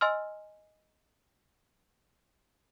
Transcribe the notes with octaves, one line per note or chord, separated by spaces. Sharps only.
D#5 G#5 C6 E6 F6